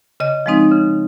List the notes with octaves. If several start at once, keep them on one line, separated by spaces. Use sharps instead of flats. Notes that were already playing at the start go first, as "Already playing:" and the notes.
C#3 D#5
F3 G#3 C4 D#4
C#3